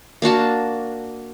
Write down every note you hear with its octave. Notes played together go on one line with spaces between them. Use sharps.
A#3 D4 F#4 A5